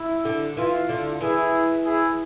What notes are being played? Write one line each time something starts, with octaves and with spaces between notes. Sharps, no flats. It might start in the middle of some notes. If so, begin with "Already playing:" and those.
Already playing: E4
D3
E3 F4
D3
E3 E4 G#4
E4 G#4